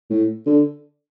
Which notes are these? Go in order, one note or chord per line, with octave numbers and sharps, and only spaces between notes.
A2
D3